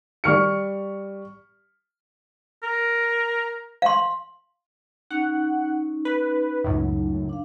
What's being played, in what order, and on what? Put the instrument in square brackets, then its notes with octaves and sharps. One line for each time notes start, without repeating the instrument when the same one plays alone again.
[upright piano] G3 C#6 F6 C#7
[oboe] A#4
[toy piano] F5 C6
[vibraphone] C#4 D#4 [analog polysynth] F#5
[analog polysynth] B4
[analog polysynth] C#2 F#2 A2 [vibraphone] F#3 D#4
[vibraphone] D4 F5